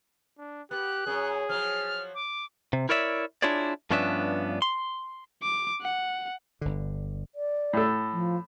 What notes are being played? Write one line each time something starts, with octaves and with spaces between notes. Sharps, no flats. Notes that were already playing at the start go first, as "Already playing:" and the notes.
D4
B3 G4 F#6
F#2 G#4
F3 F#3 F6
D6
C3
E4 A#4 C#5 D5 E5
D4 E4 F4 G#4 C#5 D5
G2 F3 B3 C#4 D4 E5
C6
D6
F#5
G1 D3
D5
A2 A4
F3